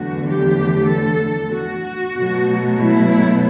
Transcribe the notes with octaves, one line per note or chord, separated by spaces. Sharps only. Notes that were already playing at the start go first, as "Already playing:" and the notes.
Already playing: E2 D3 F#3 A3 F#4
G4
A4
F#4
B2 F#3 A3
E4